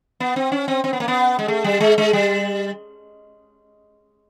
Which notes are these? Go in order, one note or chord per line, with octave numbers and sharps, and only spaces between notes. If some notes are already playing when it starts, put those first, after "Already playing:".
B3
C4
C#4
C4
C4
B3
A#3
B3
G#3
A3
G3
G#3
G#3
G3